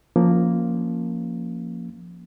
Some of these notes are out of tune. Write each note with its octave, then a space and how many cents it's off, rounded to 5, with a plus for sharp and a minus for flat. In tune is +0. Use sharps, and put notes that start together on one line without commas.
F3 +0 A#3 +0 C#4 +0